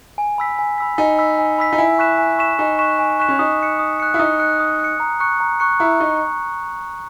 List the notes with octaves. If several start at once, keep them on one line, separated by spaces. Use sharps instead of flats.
G#5
B5 E6 B6
G#5
B5 E6 B6
D#4 G#5
B5 E6 B6
G#5
B5 E6 B6
D#4
E4 G#5
C#6 F#6 B6 E7
G#5
C#6 F#6 B6 E7
D#4 G#5
C#6 F#6 B6 E7
G#5
C#6 F#6 B6 E7
C#4
D#4 D#6
F#6 C#7
D#6
F#6 C#7
E4
D#4 D#6
F#6 C#7
D#6
F#6 C#7
A#5
C#6 F#6 C#7
A#5
C#6 F#6 C#7
E4 A#5
D#4 C#6